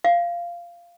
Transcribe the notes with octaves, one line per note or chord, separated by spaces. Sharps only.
F5